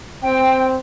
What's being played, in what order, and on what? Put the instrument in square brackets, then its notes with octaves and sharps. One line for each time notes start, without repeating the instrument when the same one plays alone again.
[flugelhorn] C4 [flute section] G5